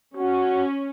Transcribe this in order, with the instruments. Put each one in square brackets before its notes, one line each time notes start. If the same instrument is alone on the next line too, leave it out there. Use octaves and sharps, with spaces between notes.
[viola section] C#4 [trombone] F#4